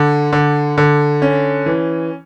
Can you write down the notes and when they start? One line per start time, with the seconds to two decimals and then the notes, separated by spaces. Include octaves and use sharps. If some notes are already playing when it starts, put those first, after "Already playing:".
Already playing: D3
0.33 D3
0.78 D3
1.22 C#4
1.66 E3